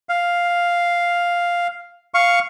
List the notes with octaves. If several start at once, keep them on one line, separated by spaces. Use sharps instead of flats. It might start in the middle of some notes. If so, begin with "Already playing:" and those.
F5
F5 C#6